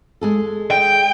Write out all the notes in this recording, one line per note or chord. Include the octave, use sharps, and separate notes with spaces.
G#3 G#4 A4
G5